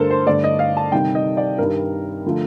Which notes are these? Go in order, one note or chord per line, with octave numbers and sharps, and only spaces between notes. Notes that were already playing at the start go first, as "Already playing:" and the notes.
Already playing: G2 D3 A3 A4 A#4 C5
C5
G2 D3 A3 D5
D#5
F5
A5
C3 D#3 G3 G5
D#5
D5
G2 D#3 G3 A#4
D3 F3 A3